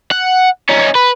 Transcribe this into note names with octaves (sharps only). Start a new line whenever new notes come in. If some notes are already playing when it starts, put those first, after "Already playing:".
F#5
C#4 D#4
B4